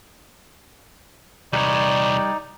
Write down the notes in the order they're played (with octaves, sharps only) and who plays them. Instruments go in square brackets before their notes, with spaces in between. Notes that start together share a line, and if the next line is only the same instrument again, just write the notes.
[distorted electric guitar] E2 C3 [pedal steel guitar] G3 B4 C#5 [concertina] D#4 [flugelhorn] D5